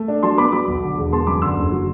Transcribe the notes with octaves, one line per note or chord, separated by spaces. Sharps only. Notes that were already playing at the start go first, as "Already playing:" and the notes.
Already playing: A3
D4
F#3 A5 C6
B3 B5 D6
F#3 B5 D6
B1
D3
E1
B3 A5 C6
F#2 B5 D6
D3 C6 E6
F#1
F#3